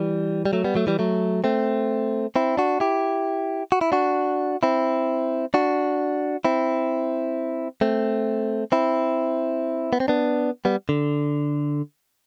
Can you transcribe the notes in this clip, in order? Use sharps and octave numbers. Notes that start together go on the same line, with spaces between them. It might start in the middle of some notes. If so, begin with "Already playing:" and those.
Already playing: E3 G3
G3
F#3 A3
G3 B3
F#3 A3
E3 G3
F#3 A3
A3 C4
C4 E4
D4 F#4
E4 G4
F#4
E4
D4 F#4
C4 E4
D4 F#4
C4 E4
A3 C4
C4 E4
B3
C4
B3 D4
G3 B3
D3